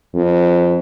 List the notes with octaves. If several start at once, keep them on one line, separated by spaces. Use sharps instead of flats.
F2